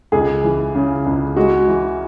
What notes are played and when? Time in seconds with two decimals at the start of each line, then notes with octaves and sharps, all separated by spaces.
0.12 C#2 G#4
0.44 E3
0.75 C#3
1.06 C#2
1.36 G#3 F#4
1.68 E3